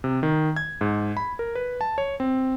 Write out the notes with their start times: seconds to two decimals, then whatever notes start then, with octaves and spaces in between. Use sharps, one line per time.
0.04 C3
0.23 D#3
0.56 G#6
0.81 G#2
1.17 B5
1.39 A#4
1.55 B4
1.81 A5
1.98 C#5
2.20 C4